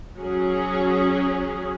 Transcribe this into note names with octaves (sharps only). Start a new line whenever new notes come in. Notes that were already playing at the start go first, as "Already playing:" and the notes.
F#3 C#4 G#4